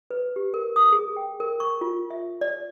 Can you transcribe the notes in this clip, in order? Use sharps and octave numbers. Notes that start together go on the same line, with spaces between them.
B4
G4
A#4
D#6
G#4
G5
A#4
C#6
F4
E5
D5